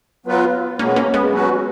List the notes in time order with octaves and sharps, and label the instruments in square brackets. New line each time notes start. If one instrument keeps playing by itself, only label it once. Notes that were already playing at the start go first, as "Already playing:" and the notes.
[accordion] F#3 B3 F4 B4
[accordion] B2 G#3 B3 [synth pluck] A#3 C#4
[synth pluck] A#3 C#4
G#3 B3
[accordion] F#3 C#4 F#4 B4